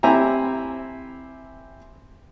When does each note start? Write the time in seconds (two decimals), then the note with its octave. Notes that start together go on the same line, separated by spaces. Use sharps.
0.03 C4 E4 G4 G#5 A#5